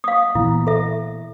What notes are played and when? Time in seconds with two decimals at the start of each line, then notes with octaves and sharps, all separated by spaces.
0.04 F5 D#6
0.35 A#2 E3 B3 E4
0.67 A4 E5